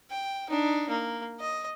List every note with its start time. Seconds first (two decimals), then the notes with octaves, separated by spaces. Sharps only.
0.10 G5
0.49 D4 D#4
0.89 A#3
1.40 D#5